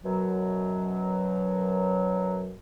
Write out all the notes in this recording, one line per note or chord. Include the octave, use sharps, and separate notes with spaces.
F#2 B2 F#3